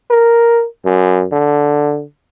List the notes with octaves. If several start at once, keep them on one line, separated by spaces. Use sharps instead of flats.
A#4
F#2
D3